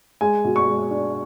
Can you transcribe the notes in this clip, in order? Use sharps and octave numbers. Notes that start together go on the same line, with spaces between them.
G#3 G#5
B2
C#6
G#3
D4